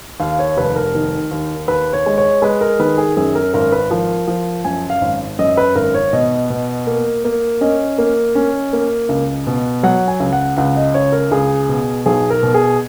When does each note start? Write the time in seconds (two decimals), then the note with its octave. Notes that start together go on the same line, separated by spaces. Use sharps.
0.20 D#2 F5
0.39 C#5
0.57 F1 B4
0.76 A#4
0.95 D#3
1.31 D#2
1.68 D#2 B4
1.93 C#5
2.06 G#3
2.18 C#5
2.42 G#3 B4
2.61 A#4
2.80 D#3 B4
2.98 G#4
3.17 F#2 G#4
3.35 A#4
3.54 G#1 A#4
3.72 B4
3.90 F3 A#4
4.27 F3
4.65 F#2 G#5
4.90 F5
5.01 G#1
5.39 F#2 D#5
5.57 B4
5.75 G#1 A#4
5.95 C#5
6.13 B2 D#5
6.50 B2
6.87 A#3
7.25 A#3
7.61 C#4 D#5
7.98 A#3
8.35 C#4
8.73 A#3
9.09 C#2
9.47 B2
9.83 F#3 F#5
10.08 G#5
10.20 C#2
10.33 F#5
10.57 C#2 F#5
10.76 D#5
10.94 C#2 C#5
11.12 A#4
11.31 C#2 G#4
11.69 B2
12.06 B1 G#4
12.30 A#4
12.43 B2
12.54 G#4